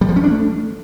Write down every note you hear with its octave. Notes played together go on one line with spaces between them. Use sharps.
G3
F3
C#4
D4
A3